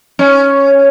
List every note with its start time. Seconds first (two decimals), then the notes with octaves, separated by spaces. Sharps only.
0.19 C#4